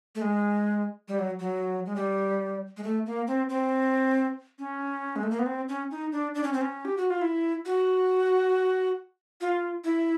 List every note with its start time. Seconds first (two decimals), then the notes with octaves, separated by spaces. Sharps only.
0.15 A3
0.22 G#3
1.08 G3
1.19 F#3
1.40 F#3
1.86 G#3
1.96 G3
2.77 G#3
2.84 A3
3.06 A#3
3.27 C4
3.49 C4
4.59 C#4
5.16 G#3
5.23 A3
5.31 A#3
5.39 B3
5.46 C4
5.69 C#4
5.91 D#4
6.12 D4
6.35 D4
6.43 C#4
6.53 C4
6.61 C#4
6.85 G4
6.97 F#4
7.10 F4
7.21 E4
7.66 F#4
9.41 F4
9.84 E4